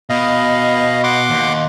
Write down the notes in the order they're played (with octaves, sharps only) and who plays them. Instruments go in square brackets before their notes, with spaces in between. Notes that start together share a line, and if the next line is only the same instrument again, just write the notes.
[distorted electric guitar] B2 [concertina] D#5 F5
[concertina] F#5 C6 D6
[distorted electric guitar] D#2